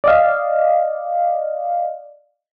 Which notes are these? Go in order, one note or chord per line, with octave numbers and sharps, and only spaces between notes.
D5 D#5 F5